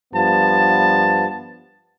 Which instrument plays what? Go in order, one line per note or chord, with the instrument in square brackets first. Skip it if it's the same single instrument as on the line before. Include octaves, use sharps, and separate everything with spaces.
[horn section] G2 F3 B3 A5